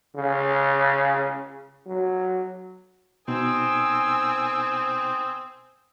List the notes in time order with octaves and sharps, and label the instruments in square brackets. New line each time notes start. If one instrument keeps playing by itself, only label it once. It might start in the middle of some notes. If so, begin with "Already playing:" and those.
[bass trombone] C#3
F#3
[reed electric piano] B2 B3 D#4 [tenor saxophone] C4 [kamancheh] G#5 E6 [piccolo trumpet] D#6